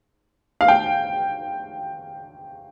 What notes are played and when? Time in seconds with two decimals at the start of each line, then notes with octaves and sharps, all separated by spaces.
0.61 F5
0.68 G5